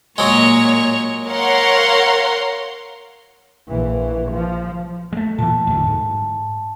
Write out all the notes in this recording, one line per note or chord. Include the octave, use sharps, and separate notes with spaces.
A#2 F#3 G#3 C#5
A#4 C#5 F5 F#5 C6
A#1 E3
F3
G#3 A3
A#2 E3 A5
D1 D2
G#2